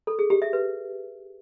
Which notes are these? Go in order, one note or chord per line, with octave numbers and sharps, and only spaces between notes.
A4
G#4
G4
E5
B4